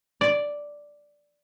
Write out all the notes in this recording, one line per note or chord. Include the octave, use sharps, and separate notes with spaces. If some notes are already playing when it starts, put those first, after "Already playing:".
D5